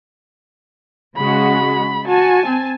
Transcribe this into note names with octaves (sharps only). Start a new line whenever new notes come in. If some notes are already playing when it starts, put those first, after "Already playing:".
C#3 G#3 F#4 B5
F#4 G#5 A5
C4